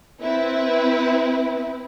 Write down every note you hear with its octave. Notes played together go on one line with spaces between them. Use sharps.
C4 E4 B4